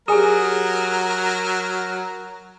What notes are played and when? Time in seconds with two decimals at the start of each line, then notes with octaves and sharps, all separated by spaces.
0.08 F#3 G4 G#4 A#4 G#5 D#6